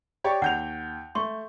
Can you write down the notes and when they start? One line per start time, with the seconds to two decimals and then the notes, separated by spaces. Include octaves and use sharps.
0.24 G4 C#5 D5
0.42 D#2 F#5 G6 F7
1.15 A3 C6 C#6